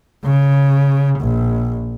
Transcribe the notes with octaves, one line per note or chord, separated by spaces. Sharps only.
C#3
A#1